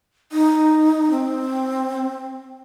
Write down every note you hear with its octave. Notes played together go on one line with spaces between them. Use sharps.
D#4
C4